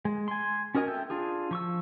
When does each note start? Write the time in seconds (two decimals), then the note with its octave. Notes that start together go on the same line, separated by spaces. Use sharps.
0.05 G#3
0.28 G#5 C6
0.75 C#4 F#4 A#4 D#5 G#5
0.88 A4 E5 G5
1.10 D4 F4 G#4
1.51 F3 C#6 E6